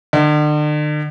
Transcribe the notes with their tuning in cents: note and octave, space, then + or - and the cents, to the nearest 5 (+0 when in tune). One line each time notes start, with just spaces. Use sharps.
D3 +40